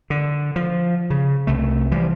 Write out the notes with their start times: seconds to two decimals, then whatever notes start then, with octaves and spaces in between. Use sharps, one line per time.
0.10 D3
0.56 F3
1.10 C#3
1.47 C2 A3
1.91 E3 F3 G3